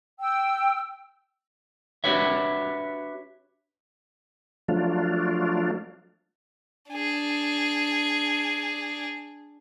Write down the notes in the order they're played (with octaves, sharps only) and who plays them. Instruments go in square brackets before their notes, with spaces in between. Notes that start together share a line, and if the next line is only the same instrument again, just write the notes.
[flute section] G5 E6
[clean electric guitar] D4 F#4 G4 B4 C#5 E5
[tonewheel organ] F3 F#3 A3 D4 F4
[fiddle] D4 G#4